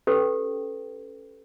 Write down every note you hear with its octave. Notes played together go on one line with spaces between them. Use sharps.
C#4 G4 A4 B4 G5